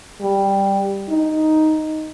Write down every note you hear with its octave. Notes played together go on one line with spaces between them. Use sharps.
G3
D#4